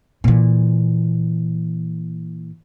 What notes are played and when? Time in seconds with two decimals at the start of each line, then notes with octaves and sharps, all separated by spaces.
0.24 A#2 E3